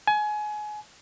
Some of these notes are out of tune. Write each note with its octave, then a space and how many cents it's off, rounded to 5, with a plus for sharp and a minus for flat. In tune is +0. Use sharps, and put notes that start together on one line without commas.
G#5 +25